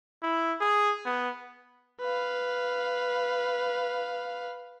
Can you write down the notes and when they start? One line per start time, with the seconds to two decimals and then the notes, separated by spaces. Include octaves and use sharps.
0.23 E4
0.61 G#4
1.05 B3
2.01 B4 F5